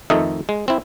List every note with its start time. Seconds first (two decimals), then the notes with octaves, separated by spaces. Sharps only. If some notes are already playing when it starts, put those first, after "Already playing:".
0.10 F2 D#3 A3 D#4 D#5 E5
0.49 G#3
0.68 C4 E4